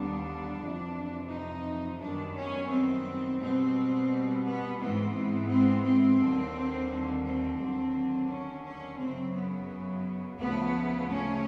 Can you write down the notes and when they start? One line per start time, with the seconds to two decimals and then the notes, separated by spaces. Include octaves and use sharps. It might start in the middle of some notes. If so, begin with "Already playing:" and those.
Already playing: D#2 D3 G3 B3 D4
0.61 F2 C3 E3
1.30 D#4
2.00 F#2 D#3 G3 B3 D4
2.35 C#4
2.70 C4
3.40 B2 G3 B3 C4
4.45 B3
4.80 G#2 E3 G#3 B3 C4
5.50 C4
5.84 C4
6.19 D#2 D3 G3
7.25 C4
7.59 D#2 D3 F#3
8.29 C#4
8.65 C#4
8.99 F#2 C#3 F#3 C4
9.34 B3
10.39 D2 C#3 F3 A3 B3
11.09 C#4